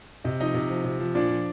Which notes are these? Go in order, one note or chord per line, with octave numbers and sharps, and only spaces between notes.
C3 D#5
F3 D#4 D#5
C3
F3
C3
F3
A#2 D4 D5
F3